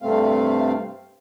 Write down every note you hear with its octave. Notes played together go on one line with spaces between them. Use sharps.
G2 C3 A3 C4 F5